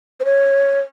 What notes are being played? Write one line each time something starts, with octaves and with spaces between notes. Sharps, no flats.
C5
C#5